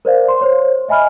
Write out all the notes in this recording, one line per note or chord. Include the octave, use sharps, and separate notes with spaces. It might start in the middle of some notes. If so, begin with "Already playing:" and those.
A#4 C5 D5 F5
C6
C5 C#5
D#5 E5 G#5 B5 F6